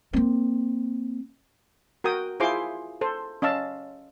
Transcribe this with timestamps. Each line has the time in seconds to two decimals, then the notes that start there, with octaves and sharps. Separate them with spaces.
0.13 A#3 C4
2.04 F#4 A#4 G5 D#6
2.40 E4 F4 G#4 C5 C6 D6
3.01 A4 C5
3.42 C#4 D#5 F5 A5 E6